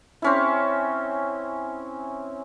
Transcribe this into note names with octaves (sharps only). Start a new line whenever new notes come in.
C4 C#4 E4